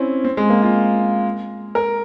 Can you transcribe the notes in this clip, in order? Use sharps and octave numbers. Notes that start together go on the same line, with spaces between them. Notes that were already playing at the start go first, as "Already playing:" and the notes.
Already playing: C4 C#4 E4
C4
G#3
A#3
F4
A#4